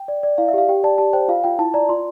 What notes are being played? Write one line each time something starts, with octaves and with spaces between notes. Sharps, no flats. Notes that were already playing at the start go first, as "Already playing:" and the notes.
Already playing: G5
D5
D5
E4 F5
E5
G4 F5
G4 G5
D5 A5
G4 A5
C5 G5
F4 F5
F4 G5
E4 A5
D5 A#5
F4 C6